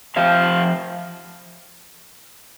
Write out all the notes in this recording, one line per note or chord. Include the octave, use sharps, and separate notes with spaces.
C3 F3 C4 F5